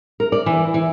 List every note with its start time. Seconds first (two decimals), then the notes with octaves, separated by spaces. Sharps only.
0.20 A#4
0.32 D5
0.46 E3
0.74 E3